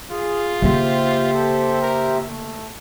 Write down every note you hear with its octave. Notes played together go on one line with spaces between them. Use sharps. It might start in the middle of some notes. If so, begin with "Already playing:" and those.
F4 G#4
C#3 A#3 G4 C5 E5
A4
A#4
A3